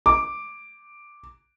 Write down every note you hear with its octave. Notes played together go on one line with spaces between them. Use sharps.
D6